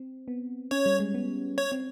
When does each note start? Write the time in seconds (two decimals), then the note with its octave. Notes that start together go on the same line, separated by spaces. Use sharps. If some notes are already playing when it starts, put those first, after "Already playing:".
Already playing: C4
0.28 B3
0.71 C#4 C#5
0.86 G3
1.00 G#3
1.14 B3
1.58 C#5
1.72 C4